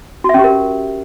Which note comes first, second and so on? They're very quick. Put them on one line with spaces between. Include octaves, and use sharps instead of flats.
F#4 E5 C#4 G4 A#4